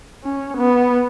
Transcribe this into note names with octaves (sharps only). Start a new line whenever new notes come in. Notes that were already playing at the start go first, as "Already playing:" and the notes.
C#4
B3